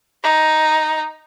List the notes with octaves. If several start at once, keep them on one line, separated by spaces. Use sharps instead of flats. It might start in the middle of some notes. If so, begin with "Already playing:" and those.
D#4